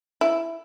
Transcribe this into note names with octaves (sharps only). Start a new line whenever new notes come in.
E4